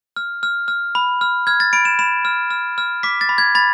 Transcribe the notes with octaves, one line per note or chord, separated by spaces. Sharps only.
F6
F6
F6
B5
F6
F6 G#6
A6
B5 D7
E7
B5 E7
F6
F6
F6
D6 B6
A6
B5
G#6
B5 A6